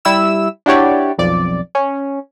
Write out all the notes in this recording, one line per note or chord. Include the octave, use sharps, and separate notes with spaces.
G3 E4 E6 E7
D4 E4 F#4 G4 C#5 D5
B1 F2 D5
C#4